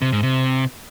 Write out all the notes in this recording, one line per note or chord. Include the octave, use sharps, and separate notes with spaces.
C3
G#2
C3